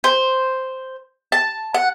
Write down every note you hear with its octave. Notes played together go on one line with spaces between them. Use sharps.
C5
A5
F#5